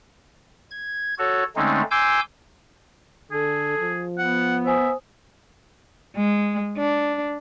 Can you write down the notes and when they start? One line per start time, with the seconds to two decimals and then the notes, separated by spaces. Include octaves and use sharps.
0.71 G#6
1.19 F#4 A4 C#5
1.56 D3 G#3 A3 C4 C#4 D#4
1.91 G#5 C6 D6 E6 G6
3.31 D3 G#4 A4
3.79 F3
4.18 B3 F#5
4.66 C5 E5 G#5 D#6
6.16 G#3
6.78 D4